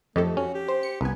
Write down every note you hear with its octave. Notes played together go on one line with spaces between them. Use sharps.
F2 A3 D#4 G4 A4
C#4 F#4
G4
C5
C#7
G1 C2 B3 G#5